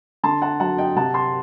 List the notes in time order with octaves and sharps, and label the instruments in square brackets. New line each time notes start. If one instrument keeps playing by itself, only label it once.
[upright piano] D3 A5 C6
F#5 A5
F#3 F#5 A5
D#5 G5
C3 F#5 A5
A5 C6